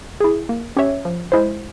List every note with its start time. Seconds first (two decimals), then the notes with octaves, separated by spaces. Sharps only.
0.20 E4 G#4
0.49 A#3
0.77 C#4 G4 C#5 E5
1.05 F3
1.32 G#3 E4 G#4 C5